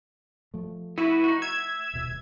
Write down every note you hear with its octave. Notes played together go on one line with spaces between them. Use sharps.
F3 A3
B3 E4 F#4 B4
D#4 F#4
E5 G#6
D#1 B2